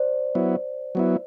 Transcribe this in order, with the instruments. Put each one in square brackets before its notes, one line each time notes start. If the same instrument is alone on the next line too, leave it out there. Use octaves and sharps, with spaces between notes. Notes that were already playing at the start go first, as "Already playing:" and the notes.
Already playing: [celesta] C5 D5
[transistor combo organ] F#3 B3 E4
F#3 B3 E4